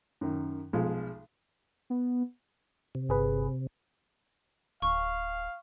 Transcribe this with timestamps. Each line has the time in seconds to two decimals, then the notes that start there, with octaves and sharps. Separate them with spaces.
0.21 F#2 D#3
0.73 B1 F3 G#3
1.90 B3
2.95 C3
3.09 G1 G#4 B4
4.82 D1 F5 C#6